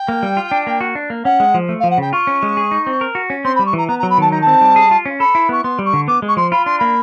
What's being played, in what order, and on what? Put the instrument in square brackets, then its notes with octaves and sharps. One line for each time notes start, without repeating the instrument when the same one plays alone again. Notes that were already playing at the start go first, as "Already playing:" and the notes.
Already playing: [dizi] G5
[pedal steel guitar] A#3
G3
F4
D4
A#3
F#4
D4
A#3
[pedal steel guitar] C#4 [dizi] F#5
[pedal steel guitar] G#3
F3
A3
[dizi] F5
[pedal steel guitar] F3
[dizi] F#5
[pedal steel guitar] C#3 [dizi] G5
[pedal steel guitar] F4 [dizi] C#6
[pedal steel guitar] C#4
G#3
G#4
D#4
C4
A#4
F#4
C#4
[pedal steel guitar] C4 [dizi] C6
[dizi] B5
[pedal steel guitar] G3
[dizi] C#6
[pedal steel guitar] E3 [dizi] A#5
[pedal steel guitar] B3 [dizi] A#5
[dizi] A#5
[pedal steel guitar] F#3
[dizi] B5
[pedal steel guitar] D#3 [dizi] A5
[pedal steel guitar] D#4 [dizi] A#5
[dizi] A5
[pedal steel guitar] C4
G3
G#4
F4
C#4
[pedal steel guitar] A4 [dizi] B5
[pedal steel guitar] E4
[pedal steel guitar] B3 [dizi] C#6
[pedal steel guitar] B3 [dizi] C6
[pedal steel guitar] G3
[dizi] C#6
[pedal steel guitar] D3
[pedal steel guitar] B3 [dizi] D6
[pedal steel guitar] G#3
[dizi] C#6
[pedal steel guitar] F3 [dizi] C6
[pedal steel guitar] F4 [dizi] B5
[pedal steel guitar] D4 [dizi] C6
[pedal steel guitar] A#3 [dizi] B5